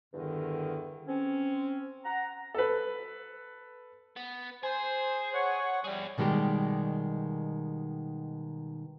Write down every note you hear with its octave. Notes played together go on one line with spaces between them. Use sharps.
E2 G2 D3 D#3
C4 C#4
F#5 A#5
A4 B4
B3
G#4 C5
C#5 F#5
G3 G#4 D5
B2 D#3 G3 G#3 G4